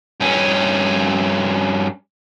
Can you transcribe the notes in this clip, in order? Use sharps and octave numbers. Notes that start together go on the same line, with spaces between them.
G2 C#4